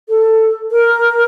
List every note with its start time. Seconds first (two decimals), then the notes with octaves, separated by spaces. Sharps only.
0.09 A4
0.71 A#4